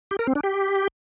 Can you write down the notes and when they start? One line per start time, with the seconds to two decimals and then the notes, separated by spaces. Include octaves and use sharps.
0.11 G4
0.19 A#4
0.27 C4
0.35 D4
0.43 G4